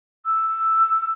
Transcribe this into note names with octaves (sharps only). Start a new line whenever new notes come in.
E6